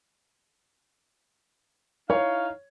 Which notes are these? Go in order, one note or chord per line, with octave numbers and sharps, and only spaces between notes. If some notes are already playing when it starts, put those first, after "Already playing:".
D#4 E4 C#5 F5